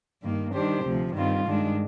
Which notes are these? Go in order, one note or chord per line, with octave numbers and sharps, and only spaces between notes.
G2 D#3 A#3
D#3 G3 D4 G4 C5
D2 C3 F3
G2 D#3 G3 C4 F4
G2 D#3 G#3 D4